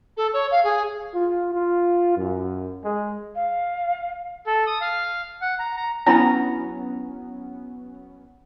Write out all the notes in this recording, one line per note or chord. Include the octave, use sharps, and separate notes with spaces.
A4
C#5
F5
G#4
F4
F4
F#2
G#3
F5
A4
D#6
F5
F#5
A#5
A#5
F#3 B3 C#4 D4 E4 A#5 B5